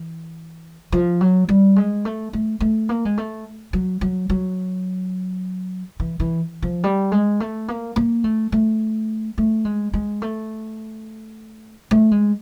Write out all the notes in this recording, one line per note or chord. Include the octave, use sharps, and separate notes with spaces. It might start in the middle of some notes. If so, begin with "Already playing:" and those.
Already playing: E3
F3
F#3
G3
G#3
A3
A3
A3
A#3
G#3
A3
F#3
F#3
F#3
E3
E3
F3
G3
G#3
A3
A#3
A#3
A3
A3
A3
G#3
G#3
A3
A3
G#3